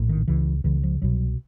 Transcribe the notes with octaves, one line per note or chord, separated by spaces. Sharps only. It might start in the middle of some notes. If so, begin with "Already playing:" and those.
Already playing: A#1 A2
D#3
C#2 C#3 E3
C#2 C#3 E3
F3
C2 B2 F#3